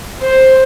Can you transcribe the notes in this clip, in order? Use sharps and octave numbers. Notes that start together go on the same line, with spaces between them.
C5